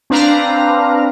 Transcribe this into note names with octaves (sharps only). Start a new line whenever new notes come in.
C4 D4 B4 F5 A#5